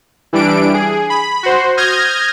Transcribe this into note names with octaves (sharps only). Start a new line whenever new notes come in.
E3 G3 D4 D7
G#4
B5
F#4 C5
D#6 F6 G6 G#6 A#6